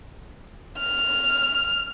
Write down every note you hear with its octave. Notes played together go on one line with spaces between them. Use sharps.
F6